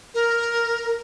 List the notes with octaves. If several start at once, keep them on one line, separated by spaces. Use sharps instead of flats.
A#4